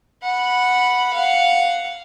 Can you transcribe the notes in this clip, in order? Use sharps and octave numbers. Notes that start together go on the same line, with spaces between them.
F#5 B5
F5 F#5